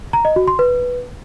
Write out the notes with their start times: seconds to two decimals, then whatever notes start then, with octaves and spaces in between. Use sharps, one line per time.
0.13 A#5
0.25 D#5
0.36 F#4
0.48 C6
0.59 B4